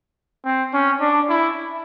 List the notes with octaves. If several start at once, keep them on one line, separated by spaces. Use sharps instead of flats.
C4
C#4
D4
E4